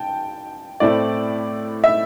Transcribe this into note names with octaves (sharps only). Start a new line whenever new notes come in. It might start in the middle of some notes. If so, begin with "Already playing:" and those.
Already playing: G5 A5
A2 A3 C4 E4 D5
E5